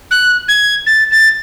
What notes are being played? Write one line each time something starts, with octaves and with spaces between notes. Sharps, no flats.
F#6
G#6
A6
A6